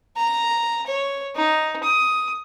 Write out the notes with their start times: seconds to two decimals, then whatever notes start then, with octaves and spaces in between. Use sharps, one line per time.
0.17 A#5
0.87 C#5
1.35 D#4
1.84 D#6